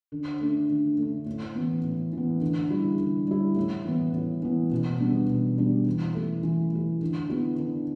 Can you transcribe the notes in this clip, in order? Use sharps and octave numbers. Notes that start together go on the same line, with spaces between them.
D3
A3 D4
D3
A3 D4
A2
E3 B3
A2
E3 B3
D3
G3 E4
D3
G3 E4
A2
E3 B3
A2
E3 B3
B2
G3 B3 D4
B2
G3 B3 D4
E3
A3 E4
E3
A3 E4
D3
B3 E4
D3